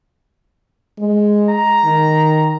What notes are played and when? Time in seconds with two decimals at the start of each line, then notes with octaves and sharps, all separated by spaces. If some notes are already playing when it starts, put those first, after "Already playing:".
0.99 G#3
1.49 A#5
1.84 D#3